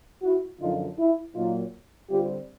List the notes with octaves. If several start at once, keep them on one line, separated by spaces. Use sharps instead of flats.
E4 F#4
F#2 D3 F3 D#4 F4
E4
A#2 F#3 A#3 D#4 F4
D3 G3 C4 F4 G4